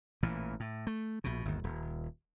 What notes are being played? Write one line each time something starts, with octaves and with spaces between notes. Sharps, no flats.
A1 A#2 E3
A2
A3
A#1 B2
G1 D#2
D#1